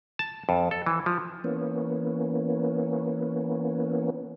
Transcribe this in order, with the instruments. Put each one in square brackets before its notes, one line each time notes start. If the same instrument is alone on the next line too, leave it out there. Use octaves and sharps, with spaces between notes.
[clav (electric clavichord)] A5
F2
A4
E3
F3
[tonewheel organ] E3 A#3 B3 C#4